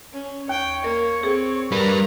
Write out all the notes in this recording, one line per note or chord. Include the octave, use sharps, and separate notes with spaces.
C#4
D#2 C#5 G5
A#3 A#4
C4 G#4 A4
G3 A#4 B4 A#5